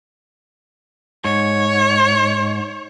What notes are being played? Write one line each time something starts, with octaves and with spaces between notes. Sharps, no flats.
G#2 C#5